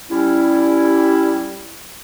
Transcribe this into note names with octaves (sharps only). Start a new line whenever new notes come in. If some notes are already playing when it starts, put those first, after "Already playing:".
G3 C#4 E4